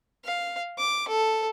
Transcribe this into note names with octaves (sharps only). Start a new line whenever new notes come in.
F5
D6
A4